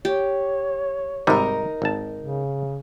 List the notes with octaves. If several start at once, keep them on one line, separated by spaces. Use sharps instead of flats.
G4 C#5
G#1 C3 G3 D#4 A#4
G#1 A5
C#3